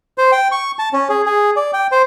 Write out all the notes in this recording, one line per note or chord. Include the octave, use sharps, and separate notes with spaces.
C5
G5
C#6
A5
C#4
G#4
G#4
D5
G5
C5